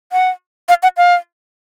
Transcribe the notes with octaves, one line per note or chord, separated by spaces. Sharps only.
F#5
F5
F#5
F5